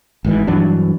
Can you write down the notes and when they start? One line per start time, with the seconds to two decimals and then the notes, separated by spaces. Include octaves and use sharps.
0.25 G#1 G#2 E3
0.47 G2 E3 F#3 D4